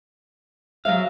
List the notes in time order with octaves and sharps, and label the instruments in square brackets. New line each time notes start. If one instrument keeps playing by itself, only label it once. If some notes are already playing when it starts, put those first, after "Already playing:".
[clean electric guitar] F#3 F5 [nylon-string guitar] G#3 C#5 E5